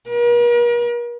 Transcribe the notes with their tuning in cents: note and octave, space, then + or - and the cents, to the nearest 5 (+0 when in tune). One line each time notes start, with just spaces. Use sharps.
A#4 +45